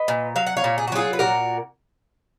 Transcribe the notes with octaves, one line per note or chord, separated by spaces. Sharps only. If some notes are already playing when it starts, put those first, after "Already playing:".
Already playing: B4 D#5
A#2
F#3 F5
F#5
C#5 F5
A#2
G#4
F#4
F#3 F4 G#4
B4
A#2 F#4 A#4